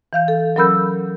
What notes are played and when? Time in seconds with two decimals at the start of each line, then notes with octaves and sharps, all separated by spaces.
0.13 E3 F5 G6
0.28 A4
0.56 F#3 C#4 A#4 B5 E6 G6